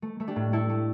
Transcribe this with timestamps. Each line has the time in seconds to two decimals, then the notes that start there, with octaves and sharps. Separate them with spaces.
0.02 A3
0.20 A3
0.28 D4 G4
0.36 A2
0.53 A3 E4 A4
0.69 A3